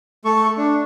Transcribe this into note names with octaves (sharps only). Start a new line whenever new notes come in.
A3 A4 C#6
D4